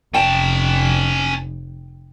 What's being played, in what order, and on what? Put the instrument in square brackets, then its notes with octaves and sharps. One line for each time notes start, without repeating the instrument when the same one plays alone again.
[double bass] F1 [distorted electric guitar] C#4 A5 [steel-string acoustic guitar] G5